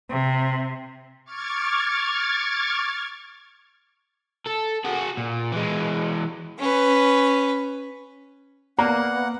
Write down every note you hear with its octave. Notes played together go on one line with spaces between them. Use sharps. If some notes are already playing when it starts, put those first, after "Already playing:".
C3
C#6 D6 F6 G#6 A6
A4
F#4 G#4
A#2
E3 G#3
C#4 B4
A#3 B3 D5 F#5 A#5